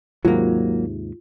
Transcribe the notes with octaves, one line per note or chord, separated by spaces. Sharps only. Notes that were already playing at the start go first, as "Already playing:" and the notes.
D#2 G#2 C3 F#3 A#3 F4